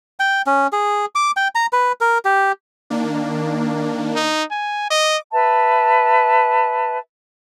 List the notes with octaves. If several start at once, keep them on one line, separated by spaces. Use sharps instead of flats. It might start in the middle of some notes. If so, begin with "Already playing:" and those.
G5
C#4
G#4
D6
G5
A#5
B4
A#4
G4
D#3 A#3 D4
D#4
G#5
D#5 D6
B4 E5 A5